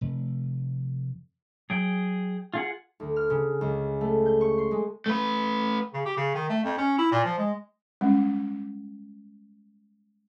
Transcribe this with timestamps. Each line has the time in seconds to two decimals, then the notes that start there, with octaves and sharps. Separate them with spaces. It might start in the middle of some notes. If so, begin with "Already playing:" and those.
0.01 F1
1.70 F#3 G#4 G5
2.54 F4 G#4 F#5
3.00 D2
3.16 F6
3.30 C#3
3.61 C#2
4.01 A3
4.26 G6
4.41 C#6
4.58 C6
4.71 G#3
5.06 A3 B4
5.94 C#3
6.05 G4
6.17 C#3
6.34 D#3
6.49 A3
6.63 F2
6.78 C#4
6.98 E4
7.12 A#2
7.24 F3
7.38 G#3
8.01 G3 G#3 C#4